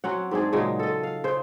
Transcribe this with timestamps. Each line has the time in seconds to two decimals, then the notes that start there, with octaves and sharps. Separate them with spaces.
0.04 F#3 C4 C#4 F#5
0.31 G#2 C4 D4 G#4
0.52 A#2 C#3 F#3 G#3
0.79 A4 D#5
1.03 F5
1.24 C#3 C5